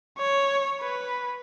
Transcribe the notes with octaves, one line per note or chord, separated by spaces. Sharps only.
C#5
B4